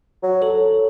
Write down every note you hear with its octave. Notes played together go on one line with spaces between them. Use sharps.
F#3
A4 C#5